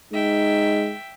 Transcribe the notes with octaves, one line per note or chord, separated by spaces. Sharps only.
G#3 D#4 E5 G5